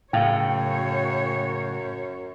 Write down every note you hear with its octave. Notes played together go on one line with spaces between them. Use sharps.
F#2 A2 C#3 C#5 F5 G5